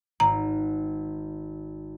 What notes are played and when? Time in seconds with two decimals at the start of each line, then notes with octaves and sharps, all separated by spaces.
0.20 G#1 A#5